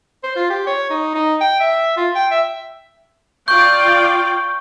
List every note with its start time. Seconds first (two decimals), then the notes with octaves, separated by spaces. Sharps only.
0.24 C5
0.36 F4
0.50 G4
0.67 C#5
0.90 D#4
1.15 D#4
1.41 G5
1.60 E5
1.97 F4
2.15 G5
2.31 E5
3.48 F4 D5 G5 C#6 G6